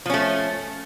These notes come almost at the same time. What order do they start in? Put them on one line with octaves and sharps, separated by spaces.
F3 C#4 A3